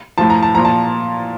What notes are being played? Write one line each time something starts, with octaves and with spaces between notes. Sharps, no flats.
A2 F3 A5
A#5
A5
A#2 F3 A#5
A5